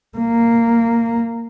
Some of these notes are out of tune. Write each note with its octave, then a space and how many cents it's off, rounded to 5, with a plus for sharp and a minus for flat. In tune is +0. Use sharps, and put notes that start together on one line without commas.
A#3 -10